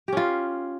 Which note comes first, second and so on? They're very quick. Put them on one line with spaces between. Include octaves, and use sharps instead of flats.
G4 C#4 F4